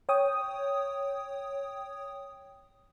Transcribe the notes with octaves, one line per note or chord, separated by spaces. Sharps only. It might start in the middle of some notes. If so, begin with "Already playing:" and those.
C#5 G5 D#6